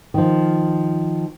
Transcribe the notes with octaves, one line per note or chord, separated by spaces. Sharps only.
D#3 F3